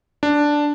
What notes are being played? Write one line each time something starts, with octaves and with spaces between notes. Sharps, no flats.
D4